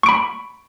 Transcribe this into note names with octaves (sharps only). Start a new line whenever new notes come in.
B5 C#6 D7